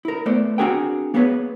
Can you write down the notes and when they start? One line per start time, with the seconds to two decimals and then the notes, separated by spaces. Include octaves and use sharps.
0.05 E4 A#4
0.26 A3 B3 C5 D5
0.58 C4 D4 F#4 G#4 A#4 G5
1.14 A#3 B3 G#4 A4 B4 C#5